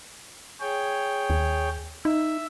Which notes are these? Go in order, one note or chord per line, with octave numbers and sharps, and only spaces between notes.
G#4 C#5 G5
D#2
D#4 E5